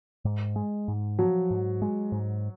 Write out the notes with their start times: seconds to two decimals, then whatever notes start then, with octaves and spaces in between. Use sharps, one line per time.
0.25 G#2
0.56 G#3
0.88 G#2
1.19 F3 F#3
1.51 G#2
1.82 G#3
2.12 G#2